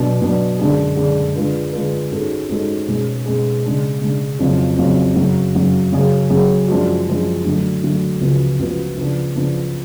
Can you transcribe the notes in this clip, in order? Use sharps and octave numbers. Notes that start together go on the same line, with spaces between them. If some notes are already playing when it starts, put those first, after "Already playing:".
Already playing: B2 F#3 B3 D4
B2 F#3 B3 D4
F#2 D3 G#3 D4 G#4
F#2 D3 G#3 D4 G#4
D3 G#3 D4 F4 B4
D3 G#3 D4 F4 B4
G#2 G#3 C#4 F#4 A4
G#2 G#3 C#4 F#4 A4
B2 G#3 C#4 G#4
B2 G#3 C#4 G#4
C#3 G#3 D4
C#3 G#3 D4
F2 C#3 F#3 C#4 F4
F2 C#3 F#3 C#4 F4
F#2 C#3 F#3
F#2 C#3 F#3
C#3 F#3 C#4 G#4
C#3 F#3 C#4 G#4
F#2 F3 G#3 D4 F#4
F#2 F3 G#3 D4 F#4
D3 F#3 A3
D3 F#3 A3
C#2 C#3 F3 B3 F#4
C#2 C#3 F3 B3 F#4
C#3 F3 B3 D4
C#3 F3 B3 D4